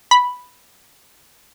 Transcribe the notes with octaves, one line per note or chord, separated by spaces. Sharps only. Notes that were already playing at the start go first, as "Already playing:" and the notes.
B5